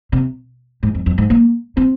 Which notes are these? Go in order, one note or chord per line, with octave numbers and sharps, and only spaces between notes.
C3
G#2
F2
F2
G#2
A#3
C4